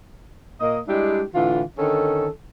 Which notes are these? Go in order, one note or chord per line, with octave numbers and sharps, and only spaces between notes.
A#2 A#3 D#5
G3 G#3 D4 E4 G4
A2 D3 E3 F4
D3 D#3 C#4 A4